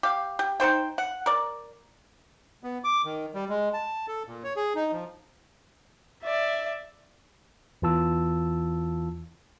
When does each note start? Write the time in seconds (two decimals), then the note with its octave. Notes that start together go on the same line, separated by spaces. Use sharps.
0.03 G4 F5
0.39 G4
0.60 D#4 F4 C5 G5
0.98 F#5
1.26 A#4 D5
2.63 B3
2.84 D6
3.05 D#3
3.34 G3
3.49 G#3
3.74 A5
4.08 A4
4.27 A#2
4.44 C#5
4.56 G#4
4.75 D#4
4.92 F3
6.23 D5 E5
7.82 E2 E3 F4 A5 E6